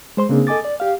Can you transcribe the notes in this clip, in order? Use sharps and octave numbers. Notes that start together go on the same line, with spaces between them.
G#3 C5 C6
C#3 A#3 C4 D4 G#4
A4 D#5 G#5 D6 A6
D5
G4 F5